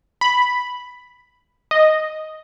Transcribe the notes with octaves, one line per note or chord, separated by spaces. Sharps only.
B5
D#5